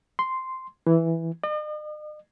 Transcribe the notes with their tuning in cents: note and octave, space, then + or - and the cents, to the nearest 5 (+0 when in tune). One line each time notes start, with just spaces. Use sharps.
C6 -5
E3 +0
D#5 -45